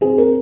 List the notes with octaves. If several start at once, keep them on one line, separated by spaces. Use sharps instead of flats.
C4 G#4
A#4